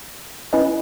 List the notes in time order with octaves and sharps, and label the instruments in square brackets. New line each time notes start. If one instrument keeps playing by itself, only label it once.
[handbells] C#4 E4 B4 D#5 G#5